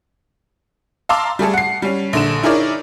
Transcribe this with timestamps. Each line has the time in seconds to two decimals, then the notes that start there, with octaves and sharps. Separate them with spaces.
1.09 F5 A5 A#5 C6 D6 E6
1.39 G3 A3 G#4 A4
1.53 F#5 C7
1.82 G3 C#4
2.13 A#1 D3 E7
2.43 D#4 E4 G#4 A#4 C#5 D5